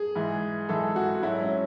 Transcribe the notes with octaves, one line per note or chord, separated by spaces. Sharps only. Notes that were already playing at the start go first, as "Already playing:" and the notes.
Already playing: G#4
G#2 E3
G#2 E3 A4
F#4
G#2 F#3 E4
C#4